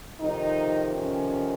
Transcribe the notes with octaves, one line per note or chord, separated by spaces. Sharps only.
F2 C3 D#3 D#4
C#4